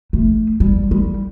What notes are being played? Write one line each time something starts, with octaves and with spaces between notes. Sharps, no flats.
A3
G3
G3